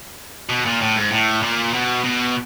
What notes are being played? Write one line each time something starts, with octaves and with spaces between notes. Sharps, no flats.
B2
A#2
A2
G#2
A2
A#2
B2
B2